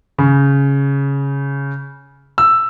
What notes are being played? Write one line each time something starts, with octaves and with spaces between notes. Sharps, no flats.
C#3
E6